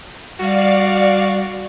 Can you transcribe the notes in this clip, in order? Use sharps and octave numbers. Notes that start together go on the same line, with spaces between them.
G3 F#4 D5 F5